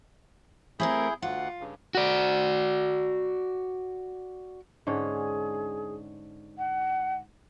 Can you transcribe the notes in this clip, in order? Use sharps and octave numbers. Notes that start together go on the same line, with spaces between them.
A3 C4 E4 G#4 A#4 G6
D2 F4 F#5
G2 C#3
F#4 D5
G#2 D3 C#4 G#4
F#5